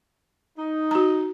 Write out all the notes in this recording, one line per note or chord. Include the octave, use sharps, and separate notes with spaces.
D#4
F#4 A#5